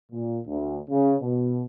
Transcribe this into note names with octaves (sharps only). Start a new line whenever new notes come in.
A#2
D2
C#3
B2